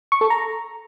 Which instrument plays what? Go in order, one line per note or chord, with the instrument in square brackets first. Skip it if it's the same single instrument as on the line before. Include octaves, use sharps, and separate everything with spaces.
[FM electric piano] C#6
A4
A#5